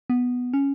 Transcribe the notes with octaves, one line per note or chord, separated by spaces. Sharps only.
B3
C#4